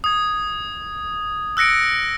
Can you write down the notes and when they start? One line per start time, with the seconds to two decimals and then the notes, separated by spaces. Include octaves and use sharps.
0.04 D#6 G#6
1.57 E6 F#6 A#6 C#7 D7